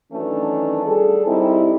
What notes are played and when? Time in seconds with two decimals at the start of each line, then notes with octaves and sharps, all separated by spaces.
0.12 D#3 E3 F#3 A3 C#4 D4
0.86 G3 G#4 A4
1.27 G3 C4 D#4 E4